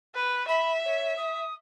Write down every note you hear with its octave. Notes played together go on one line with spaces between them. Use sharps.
B4
E5 B5
C#5
D#6